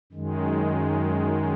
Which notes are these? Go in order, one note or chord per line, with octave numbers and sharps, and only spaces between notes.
F#2 D#3 G#3